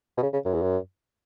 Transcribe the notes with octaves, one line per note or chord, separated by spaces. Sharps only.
B2
C#3
C#3
F#2
E2
F#2